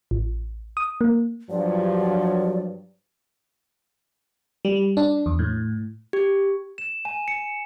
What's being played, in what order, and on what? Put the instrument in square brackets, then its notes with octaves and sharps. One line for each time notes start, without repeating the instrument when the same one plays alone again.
[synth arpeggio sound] A1
D#6
A#3
[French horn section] G2 F3 F#3 [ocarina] D5
[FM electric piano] G3
D4
E2
A2
[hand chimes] G4
[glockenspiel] E7
G#5
C#7